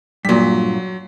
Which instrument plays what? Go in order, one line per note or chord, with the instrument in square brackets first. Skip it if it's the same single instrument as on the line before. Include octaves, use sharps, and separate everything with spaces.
[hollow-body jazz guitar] G2 A#2 [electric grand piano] F#3 B6